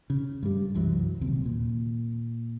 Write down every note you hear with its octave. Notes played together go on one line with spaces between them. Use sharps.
C#3
G2 G3
C2 F#2 E3 F#3
D#1 D#2 C3
A#2